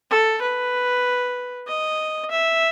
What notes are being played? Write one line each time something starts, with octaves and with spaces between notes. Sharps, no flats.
A4
B4
D#5
E5